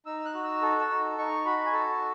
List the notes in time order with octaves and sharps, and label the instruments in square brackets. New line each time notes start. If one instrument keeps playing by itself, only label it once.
[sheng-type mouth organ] D#4 E6
F#6
F#4
E6
A4
E6
D#4
D#4 C#6
F#4 B5
G#5
A4 A5